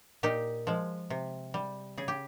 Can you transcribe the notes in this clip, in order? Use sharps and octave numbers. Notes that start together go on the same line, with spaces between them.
A#2 D#4 G4
F3 G#3
C3
G3
C#3 G#4
G4